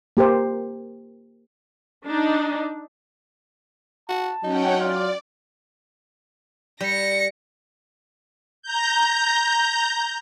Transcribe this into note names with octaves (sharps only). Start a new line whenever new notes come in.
A#3 G4 A#4 C5
D4 D#4
F#4 A5
F#3 C#4 D#4 F#5 G5
F4 D5
G3 A#6 C#7
A#5 G6